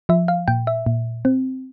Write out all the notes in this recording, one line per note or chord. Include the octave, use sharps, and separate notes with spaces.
F3 E5
F5
A#2 G5
E5
A#2
C4